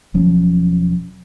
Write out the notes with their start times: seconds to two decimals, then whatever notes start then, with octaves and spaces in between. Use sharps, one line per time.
0.14 E1 F3 F#3 C#4